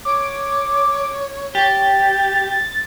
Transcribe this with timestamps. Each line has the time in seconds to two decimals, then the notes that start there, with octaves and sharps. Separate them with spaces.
0.05 C#5 D6
1.55 G4 A6